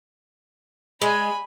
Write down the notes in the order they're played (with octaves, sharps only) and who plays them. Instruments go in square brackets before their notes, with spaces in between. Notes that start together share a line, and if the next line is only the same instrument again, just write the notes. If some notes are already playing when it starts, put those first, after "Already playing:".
[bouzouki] G#3 [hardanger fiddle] G#5 B5